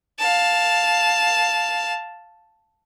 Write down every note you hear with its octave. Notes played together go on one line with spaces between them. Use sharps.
F5 A5